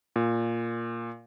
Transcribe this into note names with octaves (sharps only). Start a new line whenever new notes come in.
A#2